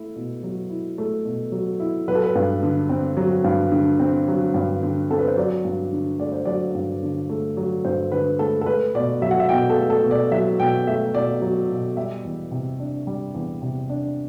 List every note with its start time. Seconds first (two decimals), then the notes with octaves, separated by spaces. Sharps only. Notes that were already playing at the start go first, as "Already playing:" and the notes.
Already playing: A3 E4
0.16 B2
0.43 F#3
0.70 E4
0.98 A3
1.25 B2
1.52 F#3
1.80 E4
2.08 F#3 B4
2.15 A4
2.23 B4
2.35 G2
2.63 D3
2.89 C4
3.17 F#3
3.44 G2
3.72 D3
3.99 C4
4.28 F#3
4.54 G2
4.83 D3
5.10 C4 A4
5.19 B4
5.28 C5
5.37 F#3 D5
5.65 G2
5.92 D3
6.19 A3 D5
6.32 C5
6.45 F#3 D5
6.75 G2
7.03 D3
7.30 A3
7.57 F#3
7.85 G2 C5
8.12 D3 B4
8.39 A3 A4
8.61 A4
8.66 A3 B4
8.95 B2 D5
9.22 F#3 E5
9.31 F#5
9.40 E5
9.49 B2 G5
9.70 A4
9.77 A3
9.90 A4
10.04 B2
10.11 D5
10.31 F#3 E5
10.59 B2 G5
10.87 A3 E5
11.14 B2 D5
11.42 F#3
11.69 B2
11.97 G3 E5
12.25 E2
12.51 C3
12.80 D4
13.07 G3
13.35 E2
13.62 C3
13.90 D4